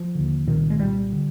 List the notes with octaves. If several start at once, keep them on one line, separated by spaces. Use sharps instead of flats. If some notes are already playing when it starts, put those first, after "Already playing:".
Already playing: F3
D#2 D3
C2 A#2 D#3
G#3
C2 A#2 G3
D3